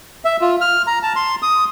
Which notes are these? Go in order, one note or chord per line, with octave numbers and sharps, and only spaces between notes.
E5
F4
F6
A#5
A5
C6
D#6